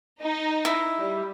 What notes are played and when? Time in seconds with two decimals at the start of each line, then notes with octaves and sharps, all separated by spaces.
0.22 D#4
0.65 E4
0.98 G3